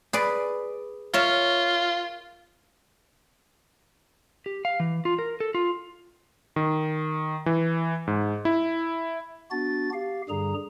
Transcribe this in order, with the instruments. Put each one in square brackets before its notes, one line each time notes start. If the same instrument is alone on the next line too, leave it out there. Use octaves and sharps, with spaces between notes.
[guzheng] G#4 B4 D5
[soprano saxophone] F4 [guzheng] A#4 C#5 E5
[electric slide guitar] G4
F5
E3
F4
A#4
A4
F4
[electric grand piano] D#3
E3
G#2
E4
[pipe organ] B3 D4 F#4 A6
G4 F5
G2 D3 G3 G#4 A#5